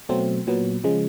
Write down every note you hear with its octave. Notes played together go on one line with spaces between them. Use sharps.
B2 F#3 A3 C4
A#2 F#3 B3
C#3 F3 G#3